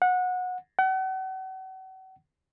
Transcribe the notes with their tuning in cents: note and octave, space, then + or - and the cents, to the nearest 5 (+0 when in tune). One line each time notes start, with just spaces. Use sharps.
F#5 -20
F#5 +40